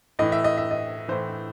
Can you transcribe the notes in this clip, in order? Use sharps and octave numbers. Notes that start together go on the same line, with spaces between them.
A2 E3 D#5
E5
D#5
E5
D#5
A2 E3 C5